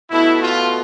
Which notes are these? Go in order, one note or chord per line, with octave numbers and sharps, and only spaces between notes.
B2 A3 E4
F4